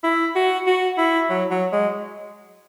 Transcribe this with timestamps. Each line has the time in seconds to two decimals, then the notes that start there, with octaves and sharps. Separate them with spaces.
0.04 E4
0.35 F#4
0.67 F#4
0.98 E4
1.30 F#3
1.51 F#3
1.73 G#3